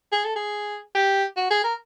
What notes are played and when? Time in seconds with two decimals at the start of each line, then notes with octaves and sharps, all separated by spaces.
0.12 G#4
0.25 A4
0.36 G#4
0.95 G4
1.36 F#4
1.50 G#4
1.64 A#4